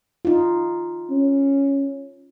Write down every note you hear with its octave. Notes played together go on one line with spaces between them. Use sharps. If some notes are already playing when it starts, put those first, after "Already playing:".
D#4 F4
C#4